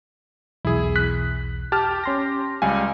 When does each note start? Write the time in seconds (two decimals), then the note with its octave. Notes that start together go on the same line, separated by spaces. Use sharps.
0.65 B1 E2 E4 G#4
0.96 F#6 B6
1.72 G4 A5 F6
2.04 C#4 C6 A#6
2.62 C#2 G3 F5 G#5